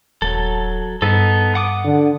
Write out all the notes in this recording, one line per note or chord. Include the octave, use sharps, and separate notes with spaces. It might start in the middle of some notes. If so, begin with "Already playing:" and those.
D#1 F#3 A4
G2 B3 D#4 A4
F#5 D6 D#6
D3